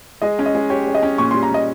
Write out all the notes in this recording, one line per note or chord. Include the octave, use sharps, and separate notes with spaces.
G#3 D#5
C#4
D#5
G#3
G4 C#5
G#3
D#5
C#4
A#2 C#6
G3 C6
A#5
A#2 D#5